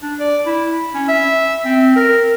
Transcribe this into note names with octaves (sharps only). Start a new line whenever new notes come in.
D4
D5
E4
C#4
E5
C4
A#4